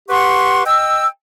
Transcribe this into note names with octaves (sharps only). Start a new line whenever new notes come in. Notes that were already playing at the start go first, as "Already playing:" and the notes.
G4 B4 F#5 C6 C#6
D#5 G5 E6